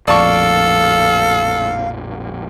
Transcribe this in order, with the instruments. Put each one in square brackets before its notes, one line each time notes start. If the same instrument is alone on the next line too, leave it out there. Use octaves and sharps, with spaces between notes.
[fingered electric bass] A#1 F2 A2 [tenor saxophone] A4 [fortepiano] D5 A5 C#6 [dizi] F5